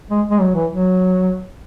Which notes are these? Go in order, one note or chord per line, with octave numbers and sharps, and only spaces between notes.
G#3
G#3
F#3
E3
F#3